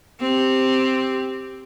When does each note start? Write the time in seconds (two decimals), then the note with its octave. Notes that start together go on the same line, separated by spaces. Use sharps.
0.20 C4 G4